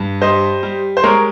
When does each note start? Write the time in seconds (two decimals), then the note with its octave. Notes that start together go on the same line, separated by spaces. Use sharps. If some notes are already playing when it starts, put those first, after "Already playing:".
Already playing: G2
0.21 G3 C5 D#5
0.63 G3
0.97 C5
1.04 G#3 A#4 C#5